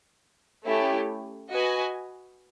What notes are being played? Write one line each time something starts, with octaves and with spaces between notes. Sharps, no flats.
A3 C#4 E4 G4
F#4 B4 D#5 G#5